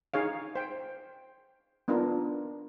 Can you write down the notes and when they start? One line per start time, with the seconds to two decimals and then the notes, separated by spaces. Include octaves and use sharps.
0.14 D#4 G#4 C#5 F5
0.55 C5 G5
1.88 B3 D4 D#4 F4 A#4